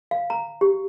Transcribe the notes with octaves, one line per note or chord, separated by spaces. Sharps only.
F5
A#5
G4